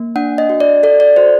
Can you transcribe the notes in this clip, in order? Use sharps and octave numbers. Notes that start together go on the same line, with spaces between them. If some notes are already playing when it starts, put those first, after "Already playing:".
Already playing: A#3
D4 F#5
D#5
F#4
D5
A4 D5
D5
F#4 C5